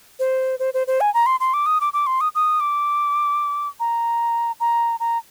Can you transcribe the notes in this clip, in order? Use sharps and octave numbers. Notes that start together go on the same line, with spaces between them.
C5
C5
C5
C5
G#5
A#5
C6
C6
D6
D#6
D6
D6
C6
D#6
D#6
D6
A#5
A#5
A#5